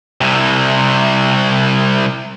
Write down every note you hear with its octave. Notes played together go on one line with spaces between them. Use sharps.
C2 C3